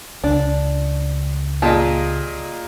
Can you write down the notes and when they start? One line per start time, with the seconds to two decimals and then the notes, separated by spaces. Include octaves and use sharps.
0.24 C#2 D4
1.62 A#2 G4 G#4 D#5 A5